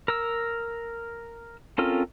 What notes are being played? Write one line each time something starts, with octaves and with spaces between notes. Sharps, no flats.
A#4 E6
C4 C#4 F4 A4 A#4